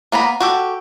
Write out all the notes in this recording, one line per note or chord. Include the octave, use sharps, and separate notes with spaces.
A#3 B3 A#5 B5
F#4 G4 A4